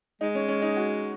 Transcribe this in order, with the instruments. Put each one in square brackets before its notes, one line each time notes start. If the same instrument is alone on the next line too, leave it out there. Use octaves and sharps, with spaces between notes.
[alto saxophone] G#3 [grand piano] D#4
[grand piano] C#4
C#4
D#4
F#4